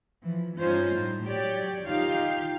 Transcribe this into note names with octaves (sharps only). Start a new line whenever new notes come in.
E3 F3
G2 C#4 D#4 F4 C5
A2 G3
F#3 G4 C#5 D5
D#3 D#4 F4 G4 F5